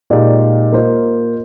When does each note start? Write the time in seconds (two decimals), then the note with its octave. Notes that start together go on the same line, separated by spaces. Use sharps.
0.10 A#2 G#3 D#4 G4 D5
0.72 A#3 F4 C5 D#5